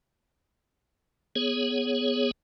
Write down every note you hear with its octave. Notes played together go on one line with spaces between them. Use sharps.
B3 G#4 C#5